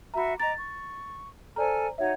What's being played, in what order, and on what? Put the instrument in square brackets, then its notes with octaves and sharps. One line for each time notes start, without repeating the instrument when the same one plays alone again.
[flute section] F#4 E5 [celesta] A#5 B5
[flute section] D#5 A#5 D6 [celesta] A6
[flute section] C#6
[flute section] A4 G#5 F6 [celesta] C5 D5 A#5
[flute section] D#4 F#4 C#5 [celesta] E5 F#5